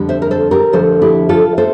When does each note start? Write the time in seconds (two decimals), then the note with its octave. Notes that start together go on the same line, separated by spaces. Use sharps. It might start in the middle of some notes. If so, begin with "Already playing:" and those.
Already playing: F2 D3 G3
0.09 C5 E5
0.22 A#4
0.31 A4 C5
0.51 G4 A#4
0.72 F2 D3 F3 A3 A4 C5
1.02 E4 G4
1.29 F4 A4
1.57 A3 A4 C5